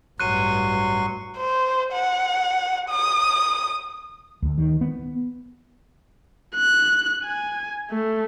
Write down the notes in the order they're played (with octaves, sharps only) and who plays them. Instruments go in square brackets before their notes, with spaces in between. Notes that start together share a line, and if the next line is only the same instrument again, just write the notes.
[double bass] A1 G2 [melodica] F#3 C6 C#6 [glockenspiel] F#6 D#7
[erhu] C5
F#5
D#6
[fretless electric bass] D2
D#3
B3
[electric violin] F#6
G#5
A3